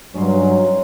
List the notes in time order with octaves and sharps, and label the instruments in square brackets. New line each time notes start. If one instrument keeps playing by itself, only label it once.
[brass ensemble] G2 F#3 [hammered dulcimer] C#4 D#4 C6